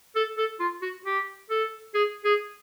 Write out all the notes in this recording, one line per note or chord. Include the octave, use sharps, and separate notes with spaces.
A4
A4
F4
F#4
G4
A4
G#4
G#4